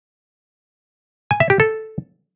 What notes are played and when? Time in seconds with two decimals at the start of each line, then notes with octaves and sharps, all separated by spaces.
1.31 G#5
1.40 E5
1.50 G4
1.60 A4